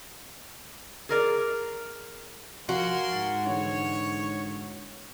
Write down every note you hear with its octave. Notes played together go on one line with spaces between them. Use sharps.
G#4 A#4 D5
F3 F#4 A#4 F5 G#5 C6
G#2 A6 F#7
D3 E3 G#3 C#5